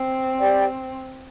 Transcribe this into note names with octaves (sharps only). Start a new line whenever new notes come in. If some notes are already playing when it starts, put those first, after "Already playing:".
Already playing: C4
G4 D5 G5